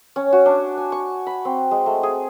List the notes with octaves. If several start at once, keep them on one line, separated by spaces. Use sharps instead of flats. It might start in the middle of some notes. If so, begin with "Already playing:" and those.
C#4
F#4
D4
G#5
C#6
B5
C4
G#3
A3
G#4